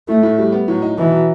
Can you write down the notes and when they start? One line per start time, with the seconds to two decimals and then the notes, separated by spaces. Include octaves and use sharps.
0.08 A2 A3
0.23 A2
0.38 G3
0.52 B3
0.68 A2 F#3
0.82 D#4
0.97 B2 E3
1.12 F#3